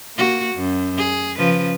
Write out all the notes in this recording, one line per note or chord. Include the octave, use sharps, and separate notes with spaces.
A#3 F#4
F#2
G#4
C#3 F3 B4